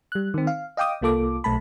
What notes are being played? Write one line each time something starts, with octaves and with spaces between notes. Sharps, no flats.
G3 F#6
D#3 C4
F5
D#5 F5 G5 D6 D#6
C2 A#3 F4 A4 D6
B1 A3 A5 B5